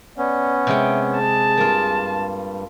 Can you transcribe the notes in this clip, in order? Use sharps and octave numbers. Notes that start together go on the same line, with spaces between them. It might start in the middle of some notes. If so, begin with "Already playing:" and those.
B3 C#4 D5
C3 G#3 E5 G5
G#4 A5
G2 A#3 F4